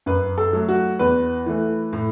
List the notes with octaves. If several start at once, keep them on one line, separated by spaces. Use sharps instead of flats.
F#2 B4
A4
F#3 A3
F#4
E2 B4
E3 A3
A2